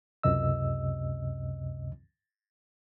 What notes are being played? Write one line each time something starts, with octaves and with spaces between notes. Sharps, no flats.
C#2 F#2 C3 D#5 E6